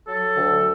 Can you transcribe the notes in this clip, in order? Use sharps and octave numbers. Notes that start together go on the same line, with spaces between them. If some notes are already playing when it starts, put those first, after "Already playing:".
F#3 A4
D2